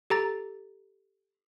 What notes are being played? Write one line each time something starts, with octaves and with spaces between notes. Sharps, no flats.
G4 A4 A#5 A6